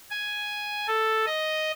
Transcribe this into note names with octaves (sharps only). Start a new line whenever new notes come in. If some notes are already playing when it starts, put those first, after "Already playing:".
G#5
A4
D#5